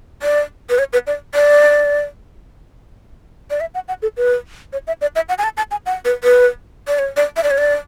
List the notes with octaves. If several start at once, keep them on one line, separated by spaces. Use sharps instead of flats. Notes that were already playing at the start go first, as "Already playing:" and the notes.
D5
B4
C#5
B4
D5
D5
D5
E5
F#5
F#5
A4
B4
C#5
E5
D5
E5
F#5
G#5
A5
A5
G#5
F#5
B4
B4
D5
C#5
D5
E5
D5
C#5
D5